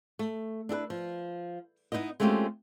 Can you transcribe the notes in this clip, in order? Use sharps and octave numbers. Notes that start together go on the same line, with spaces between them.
A3
D4 E4 A4 B4
F3
B3 D#4 E4 A#4 D#5
G#3 A3 C4 C#4 F4 G4